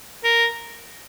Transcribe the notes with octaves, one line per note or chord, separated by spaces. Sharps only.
A#4